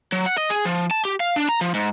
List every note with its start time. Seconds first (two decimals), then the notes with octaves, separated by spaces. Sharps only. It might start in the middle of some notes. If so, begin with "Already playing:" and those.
0.12 F#3
0.26 F#5
0.38 D#5
0.50 G#4
0.65 F3
0.91 A5
1.05 G4
1.20 F5
1.36 D4
1.49 A#5
1.61 F3
1.74 G#2